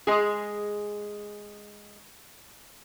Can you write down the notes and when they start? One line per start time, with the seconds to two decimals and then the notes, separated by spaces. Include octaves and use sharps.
0.07 G#3 G#4